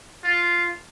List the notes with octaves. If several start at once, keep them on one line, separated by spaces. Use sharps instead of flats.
F4